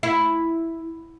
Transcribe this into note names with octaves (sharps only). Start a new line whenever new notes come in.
E4